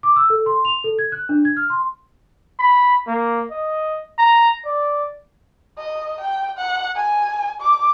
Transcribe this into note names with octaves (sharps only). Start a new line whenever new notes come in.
D6
E6
A4
C6
F7
A4
G#6
F#6
D4
G#6
F6
C6
B5
A#3
D#5
A#5
D5
D#5
G5
F#5
G#5
D6